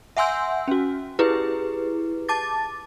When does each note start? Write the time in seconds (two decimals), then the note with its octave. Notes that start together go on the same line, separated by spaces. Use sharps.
0.17 E5 F#5 G#5 C6 E6 G6
0.68 C#4 F#4
1.19 E4 G4 G#4 B4
2.29 A5 D6 A6